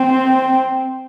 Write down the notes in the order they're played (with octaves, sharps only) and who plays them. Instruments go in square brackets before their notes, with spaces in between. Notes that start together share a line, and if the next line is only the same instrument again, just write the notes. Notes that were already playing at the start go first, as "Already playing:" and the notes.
Already playing: [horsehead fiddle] C4